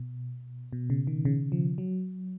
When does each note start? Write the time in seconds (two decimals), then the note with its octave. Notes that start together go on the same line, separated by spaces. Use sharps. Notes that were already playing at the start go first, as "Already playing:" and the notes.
Already playing: B2
0.73 B2
0.90 C#3
1.07 D#3
1.25 C#3
1.52 F3
1.78 F#3